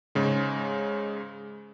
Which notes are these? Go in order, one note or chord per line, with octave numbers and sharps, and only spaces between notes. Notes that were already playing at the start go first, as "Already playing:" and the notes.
G#2 C#3 G#3